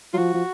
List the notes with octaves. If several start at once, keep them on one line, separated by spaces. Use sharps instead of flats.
F#3 F4
F3 F#4
F3